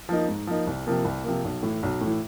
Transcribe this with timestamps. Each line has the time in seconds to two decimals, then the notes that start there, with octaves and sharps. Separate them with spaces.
0.09 F3 A#3 D#4
0.28 G#2
0.47 F3 A#3 D#4
0.67 C2
0.87 C3 F3 A#3
1.05 C2
1.24 C3 F3 A#3
1.44 B1
1.63 A2 E3
1.83 B1
2.01 A2 E3